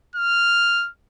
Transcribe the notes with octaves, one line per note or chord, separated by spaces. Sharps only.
F6